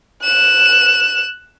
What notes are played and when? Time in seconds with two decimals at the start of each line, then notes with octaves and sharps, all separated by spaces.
0.23 F#6 E7